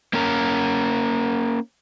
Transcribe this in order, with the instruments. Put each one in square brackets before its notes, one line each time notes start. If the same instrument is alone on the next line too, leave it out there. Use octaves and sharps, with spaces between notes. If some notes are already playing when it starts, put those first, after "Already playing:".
[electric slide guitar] A#3 C#4 A#4